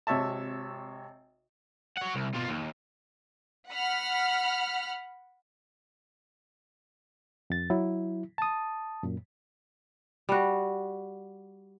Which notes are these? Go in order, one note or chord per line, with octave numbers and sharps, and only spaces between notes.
G#1 C3 C#5 E5 A5
C#5 F#5
C2
B2 F4
D#2
F#5 B5 F6
F2 A6
F#3 E4
A5 D#6
F#2 A#2
G3 F#4